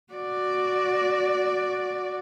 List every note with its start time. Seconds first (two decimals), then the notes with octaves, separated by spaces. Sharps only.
0.13 F#4 D5